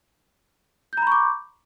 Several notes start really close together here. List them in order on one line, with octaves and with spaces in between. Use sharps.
G6 A#5 B5 C#6 D6